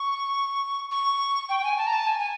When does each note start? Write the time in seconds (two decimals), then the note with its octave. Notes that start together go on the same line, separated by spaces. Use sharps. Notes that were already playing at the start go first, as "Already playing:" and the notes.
Already playing: C#6
0.91 C#6
1.49 G5
1.60 G5
1.64 G#5
1.78 A5
1.87 A#5
1.93 A5
2.07 G#5
2.19 G#5